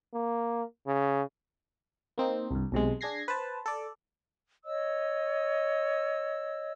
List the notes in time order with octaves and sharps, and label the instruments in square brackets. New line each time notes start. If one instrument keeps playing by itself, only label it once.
[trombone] A#3
C#3
[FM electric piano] A#3 C4 D#4
C2 G2
B1 C3 G#3
D4 G#4 G#6 A#6 C7
B4 C5 A5
A4 D5
[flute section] C#5 D#5 E6